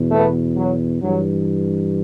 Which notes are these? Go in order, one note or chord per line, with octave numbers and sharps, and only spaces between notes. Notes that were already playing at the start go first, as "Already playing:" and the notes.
Already playing: E2 B2
A3 B3
F#3
G2 E3 F#3